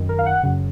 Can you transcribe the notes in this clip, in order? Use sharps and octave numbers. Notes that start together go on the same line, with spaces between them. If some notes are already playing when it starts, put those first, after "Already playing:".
Already playing: F#2 D#3
A#4
F5
F#5
F#2 C#3